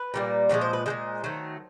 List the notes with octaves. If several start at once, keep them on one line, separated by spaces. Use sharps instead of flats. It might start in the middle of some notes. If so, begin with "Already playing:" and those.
Already playing: B4
A#2 G3 A#3
A#2 F3 G#3 C#5
C5
B4
A#2 F3 G#3 C5
D#3 F#3 A3